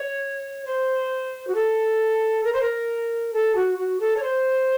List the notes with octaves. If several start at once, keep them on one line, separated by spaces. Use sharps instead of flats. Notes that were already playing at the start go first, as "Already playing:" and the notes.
Already playing: C#5
C5
F#4
A4
A#4
C5
A#4
A4
F#4
F#4
A4
C#5
C5